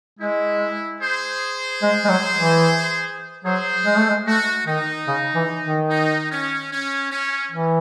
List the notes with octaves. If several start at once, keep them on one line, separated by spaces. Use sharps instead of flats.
G#3 E4
G#4 C5
G#3
G#3
F#3
E3
F#3 G#4 C5
G#3
A3
G#3
A3 F#4
D#3 D#4
C#3
E3
D#3
D#4
C#4
C#4
C#4
E3